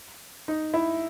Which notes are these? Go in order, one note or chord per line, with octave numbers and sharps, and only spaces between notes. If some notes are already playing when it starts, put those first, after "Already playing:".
D#4
E4